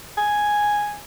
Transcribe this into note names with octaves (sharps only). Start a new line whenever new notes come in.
G#5